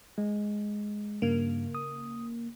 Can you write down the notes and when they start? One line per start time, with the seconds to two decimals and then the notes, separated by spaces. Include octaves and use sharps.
0.18 G#3
1.22 G2 C#3 A#3
1.75 D#6